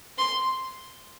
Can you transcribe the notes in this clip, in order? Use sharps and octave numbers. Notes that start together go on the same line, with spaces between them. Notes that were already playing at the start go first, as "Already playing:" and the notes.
C6